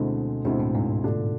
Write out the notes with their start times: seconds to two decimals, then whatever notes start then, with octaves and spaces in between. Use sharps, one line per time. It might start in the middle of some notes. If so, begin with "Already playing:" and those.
Already playing: D2 B2 D3 G#3 C4 E4
0.45 D2 B2 D3 G#3 C4 E4
0.59 A2
0.75 G#2
1.04 D3 A3 D4 F4